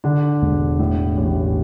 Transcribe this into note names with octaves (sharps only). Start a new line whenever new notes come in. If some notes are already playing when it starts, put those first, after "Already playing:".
D3 D4
E1
A2
A1